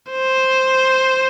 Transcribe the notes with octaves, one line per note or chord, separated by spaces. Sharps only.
C5